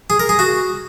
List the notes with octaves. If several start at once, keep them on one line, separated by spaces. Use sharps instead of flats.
G#4
A#4
G#4
F#4